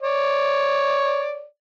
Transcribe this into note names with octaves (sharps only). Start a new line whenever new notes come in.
C#5 D5